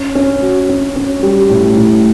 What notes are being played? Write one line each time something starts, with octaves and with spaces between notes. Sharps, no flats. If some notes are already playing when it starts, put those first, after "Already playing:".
Already playing: C#4
C#4
F#4
C#4
C#4
G3
A2
A2